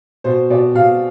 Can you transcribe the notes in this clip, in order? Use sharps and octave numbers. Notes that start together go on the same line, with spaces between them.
B2 C5
B2 D5
B2 F5